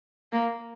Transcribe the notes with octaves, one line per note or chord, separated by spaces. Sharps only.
A#3